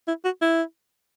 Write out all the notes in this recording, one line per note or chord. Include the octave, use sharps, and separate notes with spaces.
E4
F#4
E4